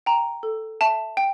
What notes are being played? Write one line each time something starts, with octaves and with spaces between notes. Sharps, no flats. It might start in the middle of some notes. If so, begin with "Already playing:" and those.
G5 A#5
A4
E5 A5
G5